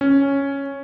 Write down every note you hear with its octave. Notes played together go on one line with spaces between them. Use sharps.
C#4